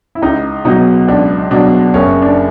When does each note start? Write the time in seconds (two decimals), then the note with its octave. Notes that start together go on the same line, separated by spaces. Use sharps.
0.15 E4
0.22 C#2 D#4
0.65 B2 F#3 D#4
1.08 C#2 D4
1.51 B2 F#3 D4
1.94 F#1 C#4
2.22 D4